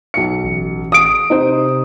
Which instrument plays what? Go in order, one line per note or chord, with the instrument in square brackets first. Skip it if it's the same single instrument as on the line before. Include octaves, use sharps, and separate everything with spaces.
[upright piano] B1 C#7
[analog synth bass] A1
[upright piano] D#6 D7
[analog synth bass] C3 [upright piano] D#4 C5